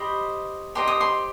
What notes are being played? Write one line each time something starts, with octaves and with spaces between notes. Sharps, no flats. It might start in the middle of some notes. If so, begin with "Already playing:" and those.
Already playing: G4 C5 D#5 B5
G4 C5 D#5 C6
D#6
C6